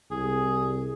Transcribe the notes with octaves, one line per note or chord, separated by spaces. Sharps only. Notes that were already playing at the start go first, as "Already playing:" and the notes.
C2 G#4